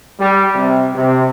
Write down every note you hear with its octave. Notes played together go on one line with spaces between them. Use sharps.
G3
C3
C3